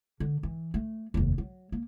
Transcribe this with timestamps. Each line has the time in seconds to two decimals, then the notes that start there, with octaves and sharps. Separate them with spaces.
0.20 D3
0.43 E3
0.74 A3
1.14 F1 D#2
1.38 F#3
1.72 A#3